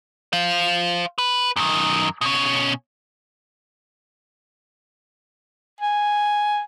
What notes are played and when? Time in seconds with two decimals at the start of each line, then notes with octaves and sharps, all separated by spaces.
0.33 C5 F5
1.18 B4
1.56 F#2 D#3
2.21 B2 C#4
5.80 G#5